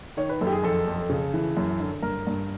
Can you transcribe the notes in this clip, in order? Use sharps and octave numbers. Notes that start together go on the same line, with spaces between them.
D#3 C#5
B4
F#2 A4
G4
G#4
F2 A4
F2
C#3
E3
F#2
D3
G2 A#4
G2